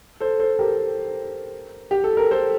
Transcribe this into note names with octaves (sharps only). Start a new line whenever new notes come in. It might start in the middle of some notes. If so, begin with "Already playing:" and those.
A4 C5
A4 C5
G4 A#4
G4
A4
A#4
A4 C5